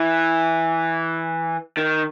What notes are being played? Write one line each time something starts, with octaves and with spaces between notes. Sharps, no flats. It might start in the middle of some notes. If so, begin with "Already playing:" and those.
Already playing: E3
D#3